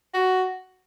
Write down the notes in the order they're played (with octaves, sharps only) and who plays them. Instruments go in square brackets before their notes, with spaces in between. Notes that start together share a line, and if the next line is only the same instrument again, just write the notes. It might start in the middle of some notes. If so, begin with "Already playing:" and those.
[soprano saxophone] F#4